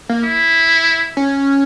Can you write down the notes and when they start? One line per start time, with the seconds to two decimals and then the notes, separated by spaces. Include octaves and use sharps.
0.09 A#3
0.24 E4
1.17 C#4